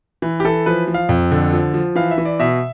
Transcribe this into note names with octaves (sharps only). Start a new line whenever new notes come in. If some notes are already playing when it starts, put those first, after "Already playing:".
E3
G4
E3 A4
F3 B4
F3
F5
F2
D3
F3
F3
E3 F5
E5
E3
D5
B2 E5